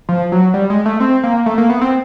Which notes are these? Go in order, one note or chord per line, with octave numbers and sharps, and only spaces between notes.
F3
F#3
G3
G#3
A3
C4
A#3
A3
A#3
B3
C4